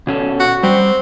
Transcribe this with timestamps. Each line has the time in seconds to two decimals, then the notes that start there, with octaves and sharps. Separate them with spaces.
0.07 B2 C#4 A4
0.40 F#4
0.63 G3 C4